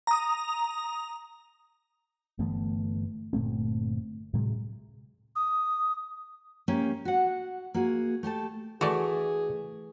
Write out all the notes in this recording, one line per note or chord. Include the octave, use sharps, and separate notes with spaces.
A#5 D#6
G1 E3 A3 B3
G1 A#2 A3 C4
A2 C3 F#3 G#3
D#6
A#3 C#4 G4
F#4 F#5
A#3 F#4 G#4
A3 G4 A4 A5
E3 A3 F#4 G#4 D5